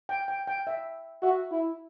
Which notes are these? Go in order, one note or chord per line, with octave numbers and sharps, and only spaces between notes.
G5
G5
G5
E5
F#4 E5
E4